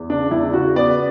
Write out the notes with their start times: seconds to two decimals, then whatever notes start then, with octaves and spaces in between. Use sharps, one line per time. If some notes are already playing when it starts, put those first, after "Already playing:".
Already playing: E2
0.10 C#3 D4
0.31 E2 E4
0.53 C#3 F#4
0.76 B3 D5